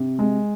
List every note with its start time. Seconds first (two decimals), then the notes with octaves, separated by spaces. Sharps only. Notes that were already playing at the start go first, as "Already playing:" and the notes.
Already playing: C3
0.19 G#3